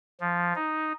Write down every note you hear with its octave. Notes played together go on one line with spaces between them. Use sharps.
F3
D#4